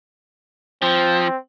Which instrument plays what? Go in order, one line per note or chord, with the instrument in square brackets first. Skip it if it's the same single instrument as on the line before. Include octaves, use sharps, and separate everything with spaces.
[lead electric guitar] F3 [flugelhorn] C4